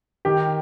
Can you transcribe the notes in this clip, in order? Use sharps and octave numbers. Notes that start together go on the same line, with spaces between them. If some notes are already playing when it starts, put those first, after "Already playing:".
D#3 G4